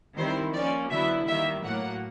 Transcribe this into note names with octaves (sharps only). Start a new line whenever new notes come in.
D#3 G3 C4 E4 C5
F3 A#3 C#4 D5
D3 F#3 B3 E4 E5
D#3 G3 A#3 E5
A2 F#3 A#3 F#5